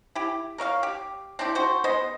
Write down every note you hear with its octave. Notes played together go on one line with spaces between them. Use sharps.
E4 G4
A#4 C#5 E5 F5
G4
C4 D4 E4 G4
F#4 A4 C5
G#3 B3 C5 D#5